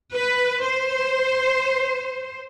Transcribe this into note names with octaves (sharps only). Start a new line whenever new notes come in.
B4
C5